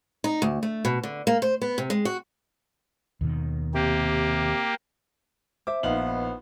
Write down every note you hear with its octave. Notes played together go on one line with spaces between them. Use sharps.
D#4
D2
A3
B2
D3
A#3
C5
B3
C3
G#3
F#4
D#2 B2 D#3
C3 A#3 G4
C5 E5 D6
A#1 B3 D#4 B4 F5 F#7